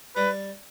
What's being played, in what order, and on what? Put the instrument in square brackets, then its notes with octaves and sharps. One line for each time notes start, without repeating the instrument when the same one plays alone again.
[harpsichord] G3 [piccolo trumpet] B4